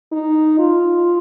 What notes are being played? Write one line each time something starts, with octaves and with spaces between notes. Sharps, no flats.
D#4
F4